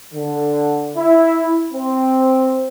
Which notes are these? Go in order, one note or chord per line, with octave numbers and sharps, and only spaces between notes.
D3
E4
C4